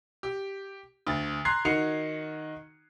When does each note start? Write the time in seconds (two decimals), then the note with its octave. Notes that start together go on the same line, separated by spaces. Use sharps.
0.23 G4
1.07 D2 A6
1.45 A#5 C6 F#6 G#6 C7
1.65 D#3 D#4 F#4 C7 C#7 F7